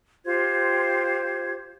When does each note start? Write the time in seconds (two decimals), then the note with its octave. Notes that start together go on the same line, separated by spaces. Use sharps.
0.25 F4 G4 C5 G#6